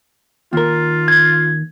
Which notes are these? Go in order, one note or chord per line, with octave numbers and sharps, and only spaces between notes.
D#2 F4 A#4
G#6